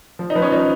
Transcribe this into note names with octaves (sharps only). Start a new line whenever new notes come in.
F3
D#4
F3 B3
C#4
F3 D#4